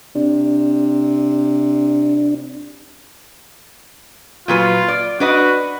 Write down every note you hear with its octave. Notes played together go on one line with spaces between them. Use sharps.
C3 D4
A#2 F#3 F4 B4
D5
D4 F#4 B4 D#5